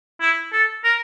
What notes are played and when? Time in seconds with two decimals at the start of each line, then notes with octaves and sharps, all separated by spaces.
0.21 E4
0.53 A4
0.84 A#4